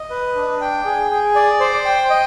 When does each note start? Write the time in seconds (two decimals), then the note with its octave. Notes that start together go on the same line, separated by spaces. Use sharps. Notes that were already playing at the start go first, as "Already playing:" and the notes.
Already playing: D#5
0.10 B4
0.36 D4
0.61 G5
0.85 G#4
1.11 G#4
1.36 D5
1.60 C5
1.85 G5
2.10 D#5